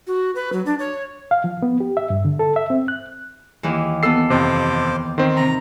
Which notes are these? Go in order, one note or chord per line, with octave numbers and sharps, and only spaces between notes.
F#4
B4
F#3
D4
C#5
F5
F3
B3
G4
E5
G2
D3
A4
E5
C4
F#6
D#2 E3
B3 A4 E6 C7
F2 C3 C5 D6
D#3 C4 C5
C3 A#5 B5